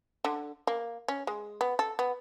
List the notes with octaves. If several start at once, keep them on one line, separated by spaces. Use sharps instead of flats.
D3
A#3
C#4
G#3
B3
A4
B3